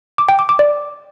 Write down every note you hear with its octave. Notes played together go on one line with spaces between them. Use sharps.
D6
G5
D6
D6
D5